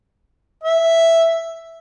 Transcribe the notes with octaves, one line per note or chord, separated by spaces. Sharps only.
E5